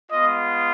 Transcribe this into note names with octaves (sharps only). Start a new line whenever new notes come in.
G#3 B3 F4 D#5